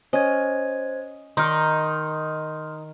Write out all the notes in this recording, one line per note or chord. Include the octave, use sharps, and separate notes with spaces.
C#4 C5 D#5 G#6
D#3 D#4 C6 D6 F6